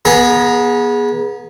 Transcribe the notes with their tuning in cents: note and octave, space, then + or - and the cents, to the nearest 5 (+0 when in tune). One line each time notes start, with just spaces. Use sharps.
B3 -30 G#4 -5 A#5 +0